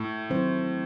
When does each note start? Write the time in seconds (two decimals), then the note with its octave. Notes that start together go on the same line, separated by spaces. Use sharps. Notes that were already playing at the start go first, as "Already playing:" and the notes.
Already playing: A2
0.30 D#3 F#3 C4 E4 C5